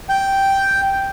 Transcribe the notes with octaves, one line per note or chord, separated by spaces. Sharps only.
G5